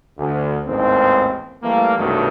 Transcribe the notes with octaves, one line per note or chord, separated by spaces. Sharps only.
D2
A1 D#2 G#2 D#3 C4
E3 G3 A3 A#3
C2 G2 B2 D#3 F#3 A3